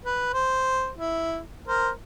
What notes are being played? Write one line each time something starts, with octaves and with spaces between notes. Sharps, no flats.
B4
C5
E4
A#4 C5